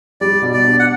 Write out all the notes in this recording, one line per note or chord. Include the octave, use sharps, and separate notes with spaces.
G3 D5
B2
D5
D4
F#5